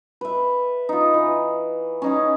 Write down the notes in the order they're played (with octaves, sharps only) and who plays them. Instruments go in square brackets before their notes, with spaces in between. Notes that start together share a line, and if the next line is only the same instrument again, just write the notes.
[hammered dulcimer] B4 E5
D#4 F4
E3
C#4 D#4 G#4